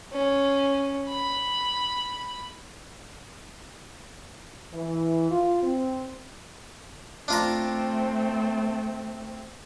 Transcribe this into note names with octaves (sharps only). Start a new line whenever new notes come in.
C#4
B5
E3
F4
C4
A3 C4 D4 F4 A#5